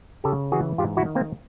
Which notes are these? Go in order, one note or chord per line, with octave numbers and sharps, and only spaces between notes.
C#3 G4 A4
E3 F#4 G#4
G#2 F4 G4
E4 F#4
D#3
A#3 C4